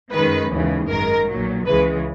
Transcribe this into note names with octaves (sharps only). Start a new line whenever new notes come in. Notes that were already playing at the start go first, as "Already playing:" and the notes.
F#2 D#3 G#3 B4
D#2 C#3 E3 G#3
G#1 F#2 D#3 G#3 A#4
B1 A#2 F#3
C#2 C#3 E3 G#3 B4